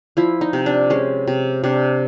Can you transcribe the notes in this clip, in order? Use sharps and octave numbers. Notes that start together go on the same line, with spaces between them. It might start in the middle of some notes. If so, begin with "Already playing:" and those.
F3 E4
D#4
C3
D4
G#3 C#4
C3
C3 D4